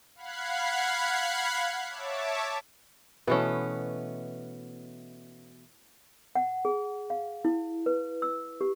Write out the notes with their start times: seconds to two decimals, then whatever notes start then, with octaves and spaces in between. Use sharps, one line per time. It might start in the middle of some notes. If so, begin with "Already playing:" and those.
0.15 F5 F#5 B5 F#6 G#6 C7
1.89 C#5 E5 A5 D6
3.27 B2 E3 A3 B3 C#4
6.35 F#5
6.65 G#4
7.10 F5
7.45 E4
7.86 B4
8.22 E6
8.61 G4